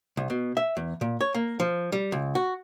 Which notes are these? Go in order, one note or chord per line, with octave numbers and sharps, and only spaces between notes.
C2
B2
E5
E2
A#2
C#5
A#3
F3
G3
C#2
F#4